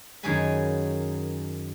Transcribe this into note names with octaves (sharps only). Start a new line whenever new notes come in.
F#2 D#3 G#4 C#5 G#5 B5